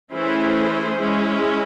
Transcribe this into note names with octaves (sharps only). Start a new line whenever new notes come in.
E3 A3 C#4 E4 G#4 C5
G#3 C#4 E4